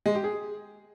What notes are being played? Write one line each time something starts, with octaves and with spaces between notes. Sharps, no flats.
G#3
G4
G#4